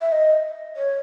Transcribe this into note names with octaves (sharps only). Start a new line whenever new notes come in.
E5
D#5
C#5